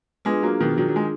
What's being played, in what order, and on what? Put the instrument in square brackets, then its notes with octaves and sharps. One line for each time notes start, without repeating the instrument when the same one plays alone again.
[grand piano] G#3 B3 [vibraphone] D4 F4 G#4
[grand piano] F#3 A#3
B2 D#3
D#3 F#3
F#3
G#3